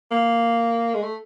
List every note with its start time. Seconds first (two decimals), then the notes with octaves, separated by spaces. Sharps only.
0.12 A#3
0.94 G#3
1.03 A3